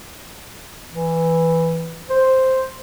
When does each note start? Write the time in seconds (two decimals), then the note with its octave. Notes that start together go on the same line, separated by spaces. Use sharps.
0.92 E3
2.10 C5